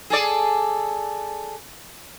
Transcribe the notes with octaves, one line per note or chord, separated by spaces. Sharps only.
G#4 A4 D5